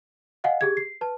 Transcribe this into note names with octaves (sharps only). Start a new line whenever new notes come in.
D#5 F5 F#5 G#5
G4 G#4 G#6
C7
B4 A5